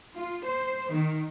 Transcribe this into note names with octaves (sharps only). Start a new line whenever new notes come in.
F4
C5
D#3